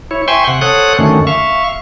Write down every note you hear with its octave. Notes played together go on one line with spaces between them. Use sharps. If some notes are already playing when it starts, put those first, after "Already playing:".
E4 C#5
C5 E5 G5 G#5 C6 C#6
C3 F#5
A4 C5 C#5 F#5 D#6 F#6
F#2 D3 D#3 A3 C#4
E5 F5 C#6